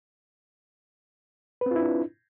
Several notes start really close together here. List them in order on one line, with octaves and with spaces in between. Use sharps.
B4 C4 F4 E4 D4